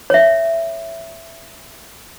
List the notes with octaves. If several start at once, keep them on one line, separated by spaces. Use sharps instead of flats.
C#5 E5